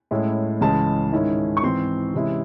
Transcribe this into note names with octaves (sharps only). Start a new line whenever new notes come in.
A2 G#3 C#4 E4
C#2 C#3 E3 G#3 A5
G#2 D#3 G#3 C#4 E4
C#6
G#2 E3 C4 C6
C3 E3 G#3 C#4 E4